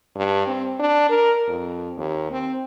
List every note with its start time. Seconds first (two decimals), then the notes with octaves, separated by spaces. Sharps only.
0.16 G2
0.47 C4
0.79 D4
1.10 A#4
1.48 F2
1.97 D#2
2.31 C4